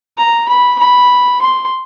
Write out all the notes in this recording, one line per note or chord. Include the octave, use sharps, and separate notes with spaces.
A#5
B5
B5
C6